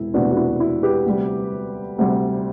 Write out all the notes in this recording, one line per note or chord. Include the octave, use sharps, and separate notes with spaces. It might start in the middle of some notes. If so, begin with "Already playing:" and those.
Already playing: E1 C3 B3 E4
E1 D2 C3 E3 B3 D4 F#4
F#4
E4
E4
G4 B4
D2 C3 G3
D2 C3 G3